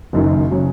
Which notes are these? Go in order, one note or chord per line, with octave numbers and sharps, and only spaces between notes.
F#1 F#2 D#3
C#3 F#3 C#4